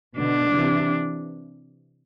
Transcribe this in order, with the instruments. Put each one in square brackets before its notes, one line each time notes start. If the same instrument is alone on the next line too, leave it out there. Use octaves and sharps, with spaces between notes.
[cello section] B2 D3 [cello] D4
[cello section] C3 E3